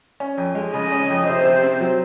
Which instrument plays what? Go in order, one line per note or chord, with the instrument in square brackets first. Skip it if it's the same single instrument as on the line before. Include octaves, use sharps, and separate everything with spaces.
[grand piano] C#4
F2
G#3
[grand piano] C#3 [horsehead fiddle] D#5
[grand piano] C#4
F2
[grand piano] C3 [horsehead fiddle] C5
[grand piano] C3
C4
F#3